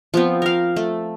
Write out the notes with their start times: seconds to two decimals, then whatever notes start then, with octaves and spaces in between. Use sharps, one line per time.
0.14 F3 B3 C4
0.42 A#4 F5
0.76 A3